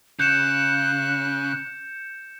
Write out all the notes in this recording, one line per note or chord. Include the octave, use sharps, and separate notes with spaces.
C#3 F#6 G6 C#7 E7